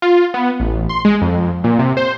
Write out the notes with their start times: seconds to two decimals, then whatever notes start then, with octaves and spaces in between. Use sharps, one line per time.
0.02 F4
0.34 B3
0.60 A1
0.89 C6
1.05 G#3
1.22 F2
1.64 A#2
1.79 C3
1.97 C5